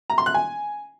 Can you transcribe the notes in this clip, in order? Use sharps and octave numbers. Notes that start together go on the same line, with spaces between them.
A#5
C6
F#6
G#5